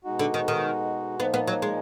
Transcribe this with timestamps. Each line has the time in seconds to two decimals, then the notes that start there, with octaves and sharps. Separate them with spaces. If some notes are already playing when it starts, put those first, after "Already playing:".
0.04 B2 G#3 D#4 F#4
0.19 D3
0.34 D#3
0.48 D#3
1.19 A#2 F3 A#3 B3 D#4
1.34 B3
1.48 F#3
1.62 G#3